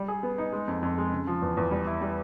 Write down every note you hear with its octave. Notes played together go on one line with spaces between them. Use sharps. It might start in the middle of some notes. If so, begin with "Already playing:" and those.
Already playing: G3
G#4
B3
D#4
G#3
F2
F2
G#3
C#3
F3
E2
E2
G3
E4
G3